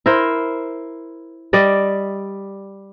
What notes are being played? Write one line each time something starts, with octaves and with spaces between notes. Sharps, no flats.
E4 A#4 C5
G3 D5 D#5